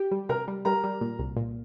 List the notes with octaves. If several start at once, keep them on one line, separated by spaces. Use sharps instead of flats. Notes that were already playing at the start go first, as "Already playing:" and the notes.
Already playing: G4
G3
C3 A#4 A#5
G3
G3 A#4 A#5
G3
A#2
C2
A#2